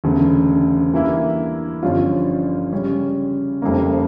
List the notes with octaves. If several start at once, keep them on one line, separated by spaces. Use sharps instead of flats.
E1 D2 C#3
G2 E3 A#3 E4
G1 G2 F3 C#4 F4
C#3 G3 C#4
F1 F2 C#3 G3 A#3